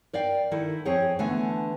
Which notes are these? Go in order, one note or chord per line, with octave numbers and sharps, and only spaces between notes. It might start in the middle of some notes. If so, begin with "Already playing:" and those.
A#4 D5 F5 G5
D#3 E4 A4
F2 C4 G#4 C#5 G5
D3 E3 A3 B3 G#5